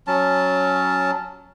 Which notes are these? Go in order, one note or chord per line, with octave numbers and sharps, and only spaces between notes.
F#3 C#4 A5